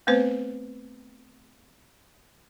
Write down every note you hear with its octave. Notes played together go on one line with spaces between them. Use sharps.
A3 B3 C4 B4 C5